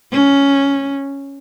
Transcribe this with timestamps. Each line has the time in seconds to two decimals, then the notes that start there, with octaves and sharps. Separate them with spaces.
0.12 C#4